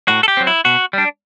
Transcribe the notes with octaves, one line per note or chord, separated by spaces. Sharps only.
A2 F#4
A4
G4
F#3 C4
E4
B2 F#4
G3 D4